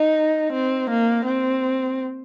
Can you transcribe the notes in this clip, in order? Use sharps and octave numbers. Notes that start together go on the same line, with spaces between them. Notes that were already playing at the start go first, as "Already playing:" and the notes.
Already playing: D#4
C4
A#3
C4